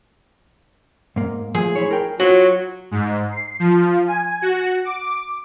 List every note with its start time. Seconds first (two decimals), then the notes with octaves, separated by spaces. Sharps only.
1.16 G#2 A#3
1.55 F3 A3 G#4
1.75 E4 C5 C#5
1.91 A#4 G5
2.20 F#3 F4 F#4 C5
2.91 G#2
3.31 C7
3.59 F3
4.07 G#5
4.42 F#4
4.85 D6